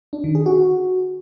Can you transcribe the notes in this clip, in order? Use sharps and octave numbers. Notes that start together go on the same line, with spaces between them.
D4
D#3
G#4
F#4